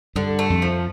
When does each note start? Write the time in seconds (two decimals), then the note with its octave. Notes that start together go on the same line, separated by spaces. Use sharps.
0.15 G2 D3
0.39 A3
0.50 F2
0.62 F3